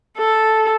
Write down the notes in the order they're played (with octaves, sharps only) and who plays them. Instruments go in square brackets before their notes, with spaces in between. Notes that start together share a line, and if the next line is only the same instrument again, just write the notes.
[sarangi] A4